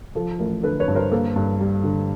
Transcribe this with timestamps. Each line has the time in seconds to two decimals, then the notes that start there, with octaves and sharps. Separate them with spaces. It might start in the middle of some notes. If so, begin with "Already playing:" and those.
0.15 F3 A4
0.39 A1 A#4
0.63 D3 A4 B4
0.80 B4 C#5
0.88 G2
0.95 A#4 C5
1.12 A#3 A4 B4
1.36 G2
1.61 G3
1.84 D3